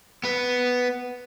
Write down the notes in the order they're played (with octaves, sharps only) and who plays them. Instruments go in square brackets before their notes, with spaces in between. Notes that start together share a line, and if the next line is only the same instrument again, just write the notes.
[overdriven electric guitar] B3 B4